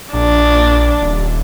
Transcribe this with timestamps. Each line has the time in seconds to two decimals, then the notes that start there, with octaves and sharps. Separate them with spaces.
0.13 A#1 D4
1.02 D#1